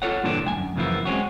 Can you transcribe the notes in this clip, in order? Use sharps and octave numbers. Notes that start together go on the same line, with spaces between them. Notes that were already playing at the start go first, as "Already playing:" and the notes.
F4 A4 C#5 F#5
G2 A#2 D3 E3 D4
D2 G2 F#5 G#5
F#2
F#2 C#3 E3 F3 A#3 E4
G#3 C4 C#4 F#4